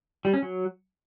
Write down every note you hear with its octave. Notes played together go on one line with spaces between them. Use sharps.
G3
C#4
F#3